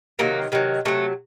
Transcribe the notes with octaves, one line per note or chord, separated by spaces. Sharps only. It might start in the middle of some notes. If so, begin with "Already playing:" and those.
C3 D#3 F#3 A#3
C3 D#3 F#3
C3 D#3 F#3 A3